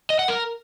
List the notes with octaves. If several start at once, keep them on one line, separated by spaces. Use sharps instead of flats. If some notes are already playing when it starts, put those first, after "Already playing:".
D#5
F#5
A#4